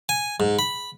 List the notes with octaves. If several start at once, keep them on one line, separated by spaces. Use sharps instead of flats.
G#5
G#2
B5